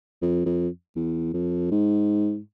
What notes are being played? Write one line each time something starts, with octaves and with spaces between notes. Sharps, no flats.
F2
F2
E2
F2
G#2